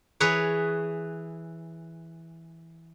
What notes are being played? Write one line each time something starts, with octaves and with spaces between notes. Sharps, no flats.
E3 G#4 B4 C#5